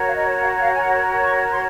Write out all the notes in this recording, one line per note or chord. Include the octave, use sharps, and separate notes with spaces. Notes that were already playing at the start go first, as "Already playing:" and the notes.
Already playing: F#4 A#4 C#5
F5
D#5
F5
F#5
F5
G#5
F#5
C#6
C6